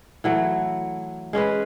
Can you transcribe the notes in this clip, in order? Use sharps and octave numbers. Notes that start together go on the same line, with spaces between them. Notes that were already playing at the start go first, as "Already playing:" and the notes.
E3 F#3 A3
G#3 C#4 G#4 B4